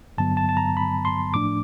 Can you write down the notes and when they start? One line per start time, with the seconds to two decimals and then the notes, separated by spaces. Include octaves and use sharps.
0.18 G2 D3 F#3 B3 A5
0.37 A5
0.49 A5
0.57 A#5
0.77 B5
1.05 C6
1.34 A2 F3 A3 D4 D6